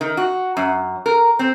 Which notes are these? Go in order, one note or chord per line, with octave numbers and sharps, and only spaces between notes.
D#3
F#4
F#2
A#4
C4